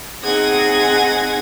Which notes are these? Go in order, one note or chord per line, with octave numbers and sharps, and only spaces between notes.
C4 D#4 G#4 F#5 G#6 A#6